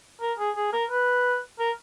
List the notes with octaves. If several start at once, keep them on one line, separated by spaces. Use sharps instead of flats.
A#4
G#4
G#4
A#4
B4
A#4